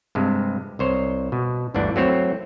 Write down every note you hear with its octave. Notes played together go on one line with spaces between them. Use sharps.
G2 C3 G#3
C2 C5 C#5
B2
G1 D2 E3 D4
F#3 A3 C4 E4 C5 C#5